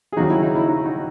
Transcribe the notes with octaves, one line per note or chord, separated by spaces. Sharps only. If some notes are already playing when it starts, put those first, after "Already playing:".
G#4
D#2 C#3 F#3 D#4 F#4
E4
D#4
E4
D#4 F#4
D#4 F#4